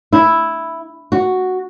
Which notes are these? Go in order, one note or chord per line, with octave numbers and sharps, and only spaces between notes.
E4
F#4